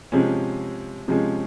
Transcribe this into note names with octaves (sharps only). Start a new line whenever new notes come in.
C3 F3 G#3 C#4
C3 F3 G#3 C#4